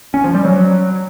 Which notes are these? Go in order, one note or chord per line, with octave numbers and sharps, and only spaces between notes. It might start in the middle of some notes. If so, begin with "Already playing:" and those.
C#4
F3
G3
F#3